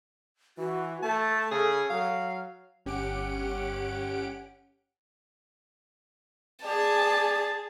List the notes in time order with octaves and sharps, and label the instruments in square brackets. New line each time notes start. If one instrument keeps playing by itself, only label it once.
[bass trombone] E3 [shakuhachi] F#4
[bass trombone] A3 [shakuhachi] A4 [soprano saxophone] A5
[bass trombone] C#3 [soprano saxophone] G#4
[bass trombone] F#3 [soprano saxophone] F5
[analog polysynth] G1 C#4 G4 F#5 D7
[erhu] G#4 [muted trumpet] D5 [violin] A5